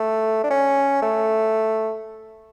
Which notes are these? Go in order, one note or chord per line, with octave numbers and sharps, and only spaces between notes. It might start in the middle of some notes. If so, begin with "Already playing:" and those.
Already playing: A3
D4
C#4
A3